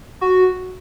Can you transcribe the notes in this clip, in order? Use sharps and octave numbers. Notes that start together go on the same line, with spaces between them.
F#4